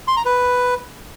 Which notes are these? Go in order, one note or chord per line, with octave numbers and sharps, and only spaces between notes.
C6
A#5
B4